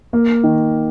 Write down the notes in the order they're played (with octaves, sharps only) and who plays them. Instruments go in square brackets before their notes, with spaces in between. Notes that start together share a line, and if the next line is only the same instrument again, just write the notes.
[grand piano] A#3
D#3